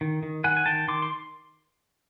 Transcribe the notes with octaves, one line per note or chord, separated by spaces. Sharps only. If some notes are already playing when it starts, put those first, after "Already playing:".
D#3
D#3
D#3 F#5 G#5
G#5
D#3 G5 A5
D#3 C6 D6
C6